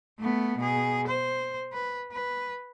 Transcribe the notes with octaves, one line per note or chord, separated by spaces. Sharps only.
A3 B3
B2 G#4
C5
B4
B4